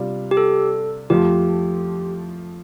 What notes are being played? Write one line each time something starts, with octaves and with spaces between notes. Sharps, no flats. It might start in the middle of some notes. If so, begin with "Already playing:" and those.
Already playing: C3 G3 D4 F4
G4
A4
F2 F3 A3 F4 G4